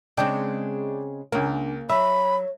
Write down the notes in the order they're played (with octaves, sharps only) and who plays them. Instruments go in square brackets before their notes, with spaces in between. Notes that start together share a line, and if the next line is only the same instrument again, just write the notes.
[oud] C#3 G#3 C4 [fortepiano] D4 G5
[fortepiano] C#2 A#4 [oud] A#3 C#4 [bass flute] D4
[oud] F#3 [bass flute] C#5 [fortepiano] E5 [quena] B5